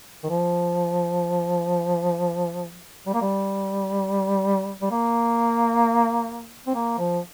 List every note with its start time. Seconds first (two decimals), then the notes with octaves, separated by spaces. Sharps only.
0.24 D#3
0.29 F3
3.06 G3
3.14 A#3
3.21 G3
4.81 G3
4.91 A#3
6.66 C4
6.75 A#3
6.98 F3